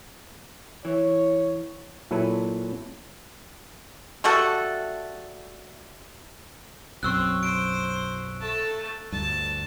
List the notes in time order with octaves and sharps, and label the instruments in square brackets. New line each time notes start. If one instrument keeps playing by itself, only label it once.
[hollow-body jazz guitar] E3 [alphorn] C#5
[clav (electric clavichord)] A#2 F#3 E4 A4 B4
[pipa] G3 A3 F#4 A4
[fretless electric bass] B1 F#2 [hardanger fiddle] C4 [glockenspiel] C#6 E6 F#6
[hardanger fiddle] C5 [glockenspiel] D7
[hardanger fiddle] A3 A5
[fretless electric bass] D2 G2 [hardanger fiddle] A5